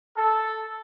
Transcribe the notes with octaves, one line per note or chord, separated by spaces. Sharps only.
A4